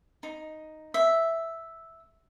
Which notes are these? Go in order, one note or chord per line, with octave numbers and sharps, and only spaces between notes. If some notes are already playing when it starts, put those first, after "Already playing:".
D#4
E5